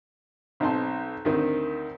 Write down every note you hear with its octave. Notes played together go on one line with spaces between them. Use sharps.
B1 C4 D#4 A5 C6
D2 D#3 C4